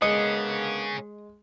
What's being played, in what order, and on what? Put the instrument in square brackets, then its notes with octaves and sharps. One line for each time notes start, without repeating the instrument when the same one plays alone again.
[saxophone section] D3 A#3 B3 [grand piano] G#3 [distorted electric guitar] G#4 C#5 [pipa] D#5